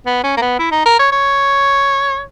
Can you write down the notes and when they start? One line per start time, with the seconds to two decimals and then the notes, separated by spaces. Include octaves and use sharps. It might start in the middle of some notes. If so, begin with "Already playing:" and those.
0.06 B3
0.24 C#4
0.37 A#3
0.41 B3
0.59 E4
0.72 D#4
0.85 A#4
0.99 C#5
1.12 C#5